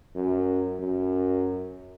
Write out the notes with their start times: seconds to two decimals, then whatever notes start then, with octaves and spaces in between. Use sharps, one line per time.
0.15 F#2
0.79 F#2